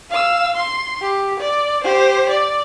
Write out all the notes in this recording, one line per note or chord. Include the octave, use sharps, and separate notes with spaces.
F5 E6
C6
G4
D5
G4 C5
D5